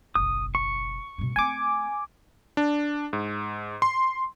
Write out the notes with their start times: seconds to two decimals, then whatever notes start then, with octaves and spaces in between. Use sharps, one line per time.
0.15 F#1 B1 D#6
0.55 C#6
1.18 G2 B2
1.36 A3 C4 G#5 D6
2.57 D4
3.13 G#2
3.82 C6